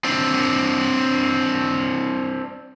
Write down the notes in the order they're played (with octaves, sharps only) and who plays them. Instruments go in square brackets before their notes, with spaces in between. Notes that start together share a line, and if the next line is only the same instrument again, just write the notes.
[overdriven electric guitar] C4 D4